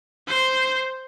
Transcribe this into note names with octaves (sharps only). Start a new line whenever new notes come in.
C5